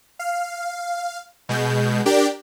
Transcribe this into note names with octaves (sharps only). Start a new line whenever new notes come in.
F5
B2 G#3 G6
D4 G4 A#4 D5 G5